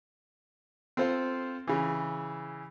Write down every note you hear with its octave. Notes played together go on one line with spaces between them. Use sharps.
C4 F4 A4 C5 F5
C#3 E3